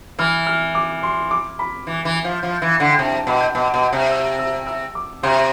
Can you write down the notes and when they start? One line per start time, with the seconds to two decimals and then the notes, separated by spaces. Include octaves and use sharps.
0.19 E3 F6
0.47 F6
0.75 D6
1.03 C6
1.31 D6
1.59 B5
1.87 E3
2.05 E3
2.25 F3
2.43 F3
2.62 E3
2.80 D3
2.90 G5
2.99 C3 A5
3.08 G5
3.13 A5
3.27 B2 B5
3.41 G6
3.54 B2 A5
3.74 B2
3.93 C3
4.11 E6
4.39 E6
4.67 E6
4.95 D6
5.23 C3 C6